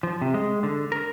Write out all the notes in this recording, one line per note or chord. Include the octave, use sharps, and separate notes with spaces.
F3
C3
G#3
D3
A#4